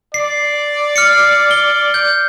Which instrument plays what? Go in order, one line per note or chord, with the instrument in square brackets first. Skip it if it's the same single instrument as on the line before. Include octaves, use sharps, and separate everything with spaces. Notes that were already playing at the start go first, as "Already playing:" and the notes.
[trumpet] D5 [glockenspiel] C7
[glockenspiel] F6 C7 C#7
G7
G6